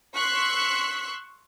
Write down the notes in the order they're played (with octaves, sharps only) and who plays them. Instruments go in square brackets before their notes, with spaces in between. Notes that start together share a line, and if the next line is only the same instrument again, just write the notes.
[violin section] C6 C#6 E6 F#6 B6